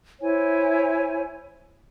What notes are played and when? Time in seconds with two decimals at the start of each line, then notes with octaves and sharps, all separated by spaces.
0.21 E4 C5 C#5 G#5